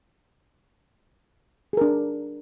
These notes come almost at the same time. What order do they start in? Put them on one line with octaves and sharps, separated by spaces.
G#4 A#4 D4